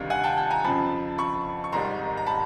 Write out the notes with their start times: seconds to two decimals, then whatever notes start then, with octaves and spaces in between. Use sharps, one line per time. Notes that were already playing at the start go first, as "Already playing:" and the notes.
Already playing: D2 C3 D#3 G3 F5
0.10 F#5 G#5
0.24 G5 A5
0.37 G5 A5
0.50 G#5 A#5
0.64 F2 C#3 F3 A5 B5
1.18 B5 C#6
1.64 C#6
1.72 G#1 G#2 D#3 G3 A#5 C6
2.17 A#5
2.27 A5 B5